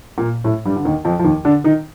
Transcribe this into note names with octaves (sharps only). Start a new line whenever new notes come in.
A#2 A#3
A2 A3
G2 G3
D3
D#2 D#3
F2 F3
F3
D#2 D#3
D3 D4
D#3 D#4